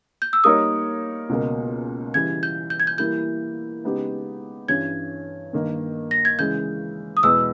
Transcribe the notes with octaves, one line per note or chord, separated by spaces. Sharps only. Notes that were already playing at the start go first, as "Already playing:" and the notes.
G6
E6
G3 A#3 D#4 A#4 C#5 D#6
C#2 B2 A#3
C#3 E3 G3 G#6
G6
G6
G#6
G6
E3 G3 A#3 E4 G6
C#3 G#3 B3 D#4 G4
G2 E3 G3 C#4 G#6
G2 D#3 A#3
A#6
G#6
C#3 E3 G#3 G6
D#6
E2 B2 G#3 B3 E6